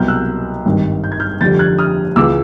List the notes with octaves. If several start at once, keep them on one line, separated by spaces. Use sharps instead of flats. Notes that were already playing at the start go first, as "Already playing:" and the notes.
Already playing: C2 B2 F#3 F6 G6
E6 F#6
G#1 G2 D#3
G6
G#6
F6 G6
F1 F2 D3 G3 G6 A6
F#6 G#6
D#6 F6
C#2 C#3 E3 D6 E6